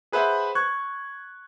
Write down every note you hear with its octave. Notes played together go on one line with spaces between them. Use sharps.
G#4 B4 C5 E5 F#5
C#6 F#6 G#6